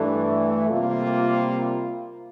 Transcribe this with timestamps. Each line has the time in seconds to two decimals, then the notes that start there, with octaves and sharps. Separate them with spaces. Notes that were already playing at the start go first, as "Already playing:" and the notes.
Already playing: G2 E3 A3 D4
0.69 C3 G3 A#3 F4